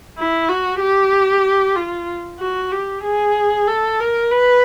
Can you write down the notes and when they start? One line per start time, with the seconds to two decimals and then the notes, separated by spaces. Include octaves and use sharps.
0.17 E4
0.49 F#4
0.80 G4
1.76 F4
2.40 F#4
2.72 G4
3.04 G#4
3.68 A4
4.00 A#4
4.31 B4